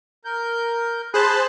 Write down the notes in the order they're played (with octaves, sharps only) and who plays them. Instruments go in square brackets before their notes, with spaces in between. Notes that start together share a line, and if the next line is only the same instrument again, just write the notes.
[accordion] A#4 G6
[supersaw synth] G#4 C5 A5 [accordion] B5 F#6